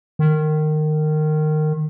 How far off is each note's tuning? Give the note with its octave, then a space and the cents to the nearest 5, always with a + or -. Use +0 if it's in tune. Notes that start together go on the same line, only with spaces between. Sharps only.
D#3 -20